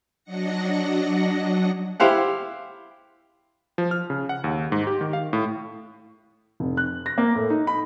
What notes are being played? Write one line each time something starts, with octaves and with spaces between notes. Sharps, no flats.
F#3 D4 D#5 F#5 A#6 C#7
E4 G4 C5 F5 F#5
F3
F6
C#3
F#5
D#2
G#2
G4
D#3
F5
A2
F1
F#6
A#6
A#3
A2
D#4
B5